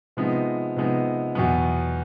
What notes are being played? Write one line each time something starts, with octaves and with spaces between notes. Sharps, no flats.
C3 F3 G#3 B3 D#4
C3 F3 G#3 B3 D#4
E2 B2 F#3 B3